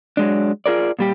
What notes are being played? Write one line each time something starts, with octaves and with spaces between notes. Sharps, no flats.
F#3 G#3 D4
F4 G#4 A#4 D5
A#2 G3 G4